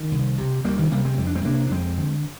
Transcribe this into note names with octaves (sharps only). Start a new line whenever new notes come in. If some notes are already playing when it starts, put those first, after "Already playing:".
Already playing: D#3
C2
C3
D2 G3 A#3
D#3 G3
C3 G3 A#3
G#3 C4
F2 C4
D4
G#3 C4
C3 A#3 D4
D4
F2 G#3 C4
D3